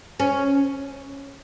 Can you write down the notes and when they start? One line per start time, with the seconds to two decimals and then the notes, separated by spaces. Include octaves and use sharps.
0.20 C#4